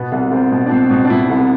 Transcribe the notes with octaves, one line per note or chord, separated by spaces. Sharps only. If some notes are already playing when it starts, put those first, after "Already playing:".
Already playing: B2 B3
C2
C2 C4
B2
D4
B2 C4
B2
D4
B2 E4
C2